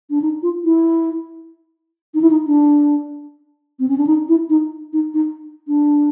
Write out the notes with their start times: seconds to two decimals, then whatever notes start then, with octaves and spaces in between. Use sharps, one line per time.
0.10 D4
0.22 D#4
0.42 F4
0.64 E4
2.14 D#4
2.21 E4
2.30 D#4
2.47 D4
3.79 C4
3.88 C#4
3.98 D4
4.07 D#4
4.28 E4
4.50 D#4
4.93 D#4
5.14 D#4
5.68 D4